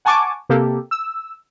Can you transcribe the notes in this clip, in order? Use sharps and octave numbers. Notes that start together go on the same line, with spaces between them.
F#5 G#5 A5 C#6 D6
C3 A#3 G4 A4
E6